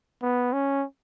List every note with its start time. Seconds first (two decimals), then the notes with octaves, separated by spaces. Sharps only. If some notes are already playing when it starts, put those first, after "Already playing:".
0.22 B3
0.53 C#4